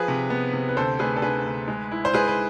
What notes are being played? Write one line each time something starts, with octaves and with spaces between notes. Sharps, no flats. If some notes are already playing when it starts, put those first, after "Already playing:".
Already playing: F3 G#4 B4
C3
B3
C3
B4
D2 A4 C5
A3 G#4 B4
A4
D3 G#4 B4
D2
G#3
E4
C5
G#3 G#4 B4
B4